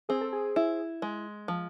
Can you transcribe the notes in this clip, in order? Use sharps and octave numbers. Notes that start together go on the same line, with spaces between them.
C4 G#4
A4
G#4
E4
G#3
F3